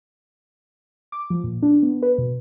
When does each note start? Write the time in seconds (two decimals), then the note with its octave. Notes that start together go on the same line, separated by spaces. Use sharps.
1.12 D6
1.30 F3
1.44 A#2
1.63 D4
1.83 B3
2.02 B4
2.18 B2